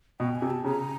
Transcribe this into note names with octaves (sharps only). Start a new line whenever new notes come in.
B2 G5
G#5
C3
A5
C#3 A#5